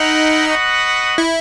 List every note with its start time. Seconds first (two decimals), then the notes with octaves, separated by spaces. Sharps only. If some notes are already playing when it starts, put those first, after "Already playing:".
Already playing: D#4 E4 A#4 D#5 F#5
0.47 F#4 B4 D#5 F#5
1.18 E4